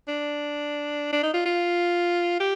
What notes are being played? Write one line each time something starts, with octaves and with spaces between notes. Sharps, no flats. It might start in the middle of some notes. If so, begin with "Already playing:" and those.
D4
D4
D#4
F4
F4
G4